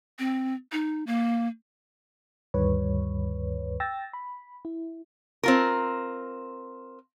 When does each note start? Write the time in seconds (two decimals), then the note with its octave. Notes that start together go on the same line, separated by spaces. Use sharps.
0.19 C4
0.72 D#4
1.07 A#3
2.54 D2 G2 D#3 G3 B4 C#5
3.80 G5 E6 A6 A#6
4.13 B5
4.65 E4
5.43 C4 F4 A#4